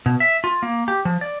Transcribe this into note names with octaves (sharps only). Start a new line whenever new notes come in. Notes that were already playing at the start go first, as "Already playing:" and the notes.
B2
E5
F4
A#3
G4
F3
D5